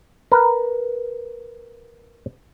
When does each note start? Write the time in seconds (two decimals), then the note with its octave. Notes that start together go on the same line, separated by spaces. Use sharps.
0.32 A#4 B4